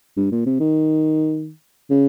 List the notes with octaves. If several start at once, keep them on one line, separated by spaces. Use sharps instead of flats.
G2
A#2
C3
D#3
C#3